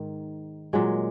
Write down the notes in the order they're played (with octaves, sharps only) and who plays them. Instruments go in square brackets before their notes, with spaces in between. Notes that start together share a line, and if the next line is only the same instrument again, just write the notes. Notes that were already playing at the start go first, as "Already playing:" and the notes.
Already playing: [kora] G#2 D#3
A#2 F#3 G#3